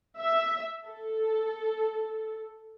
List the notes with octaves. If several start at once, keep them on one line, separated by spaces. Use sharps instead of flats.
E5
A4